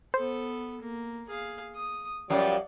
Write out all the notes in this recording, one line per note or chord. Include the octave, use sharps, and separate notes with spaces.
B3 A4 C5
A#3
G#4 F5
D#6
F#2 F3 G3 D5